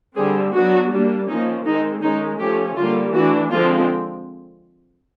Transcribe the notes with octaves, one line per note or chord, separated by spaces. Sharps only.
D3 G3 C4 G#4
F#3 B3 D4 F#4
G3 A#3 D4
F3 A#3 C#4 D#4
D#3 G#3 C4 D#4
D#3 G#3 C#4 D#4
F3 A3 C#4 G4
D3 G3 A#3 F4
E3 A3 D4 F#4
D3 F3 G#3 C4 F4